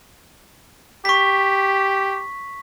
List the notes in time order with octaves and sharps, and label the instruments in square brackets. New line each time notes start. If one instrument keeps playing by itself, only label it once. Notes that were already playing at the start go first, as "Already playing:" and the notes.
[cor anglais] G4 [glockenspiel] C#6 B6